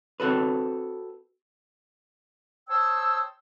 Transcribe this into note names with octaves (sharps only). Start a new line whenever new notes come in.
C4 F#4 A4 B4
C5 C#5 G5 A5 D#6 E6